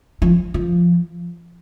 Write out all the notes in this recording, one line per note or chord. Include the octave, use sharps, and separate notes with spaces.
F3
F3